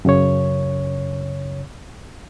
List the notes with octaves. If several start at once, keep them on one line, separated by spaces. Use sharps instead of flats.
F#2 C#3 C#5